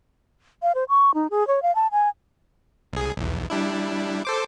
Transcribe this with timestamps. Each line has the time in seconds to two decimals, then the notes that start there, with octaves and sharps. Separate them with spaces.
0.62 F5
0.75 C5
0.89 C#6
1.14 D#4
1.31 G#4
1.47 C#5
1.63 F5
1.75 A5
1.92 G#5
2.93 C2 G#4
3.17 B1 E2
3.50 G3 D4 E4
4.25 A4 C5 D6